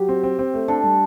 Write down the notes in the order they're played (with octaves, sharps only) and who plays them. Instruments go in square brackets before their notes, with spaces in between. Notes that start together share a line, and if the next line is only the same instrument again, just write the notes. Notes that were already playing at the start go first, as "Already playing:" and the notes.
Already playing: [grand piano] F#3 [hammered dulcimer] G4
[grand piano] C4
C4
C4
A3
[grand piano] D4 [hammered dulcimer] A4
[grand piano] G3